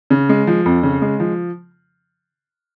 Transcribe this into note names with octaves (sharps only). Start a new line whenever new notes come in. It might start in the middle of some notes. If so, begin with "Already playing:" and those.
C#3
G#3
F3
F2
C#3
G#3
F3